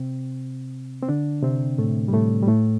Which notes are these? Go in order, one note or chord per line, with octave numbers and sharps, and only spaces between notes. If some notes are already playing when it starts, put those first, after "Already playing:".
Already playing: C3 C4
C4
D3 D4
C3 C4
A2 A3
G3
A2 A3
G3
A2 A3